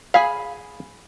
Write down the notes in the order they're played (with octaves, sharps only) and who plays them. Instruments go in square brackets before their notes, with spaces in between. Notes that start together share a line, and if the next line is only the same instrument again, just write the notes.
[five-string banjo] G#4 G#5 B5 [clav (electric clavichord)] F5